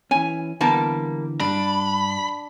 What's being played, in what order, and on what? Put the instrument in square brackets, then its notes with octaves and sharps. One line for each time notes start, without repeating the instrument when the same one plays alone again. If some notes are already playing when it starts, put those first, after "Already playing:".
[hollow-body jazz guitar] E3 C#4 [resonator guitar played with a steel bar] G#5
[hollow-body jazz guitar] D3 E3 B3 [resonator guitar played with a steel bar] G3 A#3 A5
[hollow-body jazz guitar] G2 G3 [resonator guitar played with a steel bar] D4 [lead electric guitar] B5